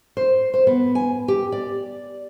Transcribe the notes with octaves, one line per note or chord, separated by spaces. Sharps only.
C5
C5
B3
G#5
G4
D5